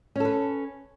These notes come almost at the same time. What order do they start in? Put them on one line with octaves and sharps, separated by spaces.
C#4 A4 B4